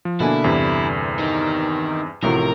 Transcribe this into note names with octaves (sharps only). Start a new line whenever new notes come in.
F3
B2 D3 A#3 D4 E4 G#5
E2 G2 C3
D#3 D#4
A1 A2 C3 F3 F#4 A#4